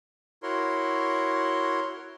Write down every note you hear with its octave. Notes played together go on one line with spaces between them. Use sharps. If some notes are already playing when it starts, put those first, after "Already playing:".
E4 F#4 A#4 C#5 C6